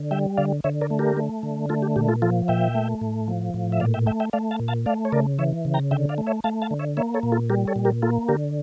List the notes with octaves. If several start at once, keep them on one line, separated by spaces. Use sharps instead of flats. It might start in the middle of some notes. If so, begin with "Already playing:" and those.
Already playing: D3
G3 E5 G5
D3 D5 F5
D3 C#5 E5
A#4 D5
A3
G4 A#4
A3
D3
A3 F4 A4
G4
A#2 G4
F4 A4
F3 F4 A4
A#2 E5 G5
A3
A2
F3
A2
E5
A#2 D5 F5
E5 G5
A3 E5 G5
E5 G5
A3 D5 F5
F5 A5
A#2
F5 A5
A3 D5 F5
C#5
C#3 A#4 D5
E3 C#5 E5
C#3
G5 A#5
D3 E5 G5
D5 F5
A3
C#5 E5
A3 F5 A5
F5 A5
D3
C#5 E5
A#3 C#5 E5
A4 C#5
A#2
F4 A4
G3 G4 A#4
A4 C#5
A#2
G4 A#4
A#3 F4 A4
D3 G4 A#4